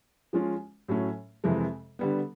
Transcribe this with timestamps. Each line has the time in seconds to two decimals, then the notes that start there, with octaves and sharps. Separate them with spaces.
0.33 F3 G#3 C#4 F4
0.88 A2 F#3 A3 C#4
1.44 F2 C3 E3 G#3
1.99 D3 G3 B3